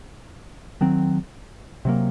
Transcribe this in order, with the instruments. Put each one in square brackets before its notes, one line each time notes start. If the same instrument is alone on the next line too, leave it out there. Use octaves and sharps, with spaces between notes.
[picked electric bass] D#3 F#3 C4
C3 F#3 A#3